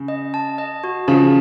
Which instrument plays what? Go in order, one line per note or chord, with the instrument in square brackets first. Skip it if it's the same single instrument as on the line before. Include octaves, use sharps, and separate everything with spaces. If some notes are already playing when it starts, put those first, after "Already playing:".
Already playing: [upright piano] C#3
[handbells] D#5
A5
D#5
F#4
[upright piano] C#3 F3 [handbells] A5